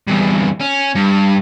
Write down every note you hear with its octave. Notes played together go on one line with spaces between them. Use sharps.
E2 G2
C#4
G2